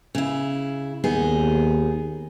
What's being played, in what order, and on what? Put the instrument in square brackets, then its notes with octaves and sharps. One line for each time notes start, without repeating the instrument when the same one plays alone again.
[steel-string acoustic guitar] C#3 E4
[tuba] D#2 [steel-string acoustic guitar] B3 D#4 G#4